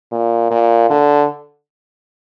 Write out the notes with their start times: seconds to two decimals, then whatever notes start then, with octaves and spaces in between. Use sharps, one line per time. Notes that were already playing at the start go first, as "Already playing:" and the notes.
0.11 A#2
0.50 A#2
0.90 D3